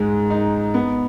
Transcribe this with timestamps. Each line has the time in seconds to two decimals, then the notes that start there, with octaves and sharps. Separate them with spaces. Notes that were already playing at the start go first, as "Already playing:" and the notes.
Already playing: G#2 G#3
0.30 D#4
0.74 B3